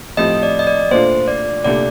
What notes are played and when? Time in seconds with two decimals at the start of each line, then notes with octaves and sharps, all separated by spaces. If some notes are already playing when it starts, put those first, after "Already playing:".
0.17 A2 F3 A3 C4 G4 D#5
0.43 D5
0.59 D#5
0.67 D5
0.91 A#2 A3 D4 F4 C5
1.28 D5
1.64 C2 A#2 A3 D4 G4 D5